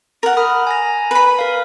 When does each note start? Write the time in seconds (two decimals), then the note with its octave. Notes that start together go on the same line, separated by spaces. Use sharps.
0.23 A#4 F#5
0.37 B5 D#6 F6
0.67 G#5 A#5 A#6
1.11 B4 B5
1.39 A#4 F5